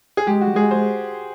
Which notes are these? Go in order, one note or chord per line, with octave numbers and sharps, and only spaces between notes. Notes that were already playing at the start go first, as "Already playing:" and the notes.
G#4
G#3 G4
F#4
G#3 G#4
C5